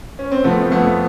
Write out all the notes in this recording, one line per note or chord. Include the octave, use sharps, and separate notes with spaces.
C#4
C4
F3 A3 B3
F2 A3 B3